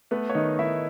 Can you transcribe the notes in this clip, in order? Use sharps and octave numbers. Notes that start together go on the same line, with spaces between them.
A3 B3 B4
C#5
D#3 D#4 D#5
D#3 E4 E5